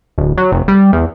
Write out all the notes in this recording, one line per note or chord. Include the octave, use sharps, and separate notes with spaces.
D1
F#3
F1
G3
E2